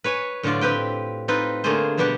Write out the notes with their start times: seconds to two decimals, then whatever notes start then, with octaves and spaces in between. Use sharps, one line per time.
0.04 B4 C#5 G#5
0.43 A2 D3 F#3 F4 D5
0.61 C4 G4 B4 G5
1.28 C4 D#4 F4 B4
1.64 D3 A3 A#3 F4 G#4 C5
1.98 B2 G3 B3 D4 G4 F#5